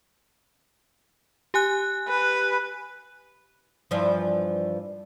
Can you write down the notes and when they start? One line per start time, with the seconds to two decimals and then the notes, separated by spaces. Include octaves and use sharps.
1.54 G4 G#5 F#6
2.09 B4
3.91 G2 E3 F3